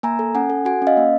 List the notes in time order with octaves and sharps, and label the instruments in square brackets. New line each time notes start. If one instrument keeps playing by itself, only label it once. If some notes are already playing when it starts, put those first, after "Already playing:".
[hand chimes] A#3 G#5 A#5
A4
C#4 F#5 G#5
A4
F#4 F#5 G#5
C#4
D#5 F5
A#3